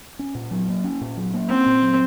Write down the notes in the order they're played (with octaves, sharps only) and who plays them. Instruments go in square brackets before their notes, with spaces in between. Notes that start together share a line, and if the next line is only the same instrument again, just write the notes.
[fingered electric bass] C#4
A#2
F#3
A#3
C#4
A#2
F#3
A#3
[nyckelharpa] C4 [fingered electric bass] C#4
[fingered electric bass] A#2
F#3